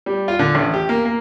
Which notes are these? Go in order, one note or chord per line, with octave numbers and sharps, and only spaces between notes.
G3
F4
D3
A1
G4
A#3
A#3